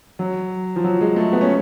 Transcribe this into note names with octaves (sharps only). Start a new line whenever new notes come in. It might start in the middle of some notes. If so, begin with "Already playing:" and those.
F#3
F3
F#3
G#3
A3
B3
C#4